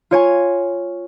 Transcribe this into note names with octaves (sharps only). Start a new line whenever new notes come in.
F4 C#5 G#5